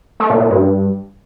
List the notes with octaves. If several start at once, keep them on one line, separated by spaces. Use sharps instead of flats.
A3
A#2
A#2
G2